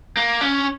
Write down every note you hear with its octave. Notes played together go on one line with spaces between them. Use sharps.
A#3
C#4